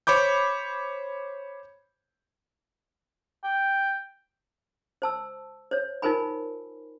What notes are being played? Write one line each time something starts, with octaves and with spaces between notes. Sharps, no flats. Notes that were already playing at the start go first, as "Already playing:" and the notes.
C5 C#5 B5 D6 G6
G5
C5 A5 E6
C5 C#5
D#4 F4 A#4 C5 G#5 B5